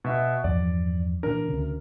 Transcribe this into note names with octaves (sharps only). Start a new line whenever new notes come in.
B2 E5
E2 G2 F3 D5
A#2 E3 D4 A#4
D2 C#3